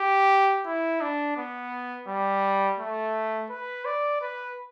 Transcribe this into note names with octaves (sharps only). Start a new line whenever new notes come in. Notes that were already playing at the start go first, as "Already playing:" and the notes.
Already playing: G4
E4
D4
B3
G3
A3
B4
D5
B4